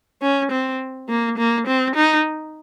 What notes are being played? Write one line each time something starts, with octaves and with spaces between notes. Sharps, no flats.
C#4
C4
A#3
A#3
C4
D#4